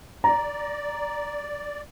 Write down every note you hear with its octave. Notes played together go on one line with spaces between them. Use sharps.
D5 A#5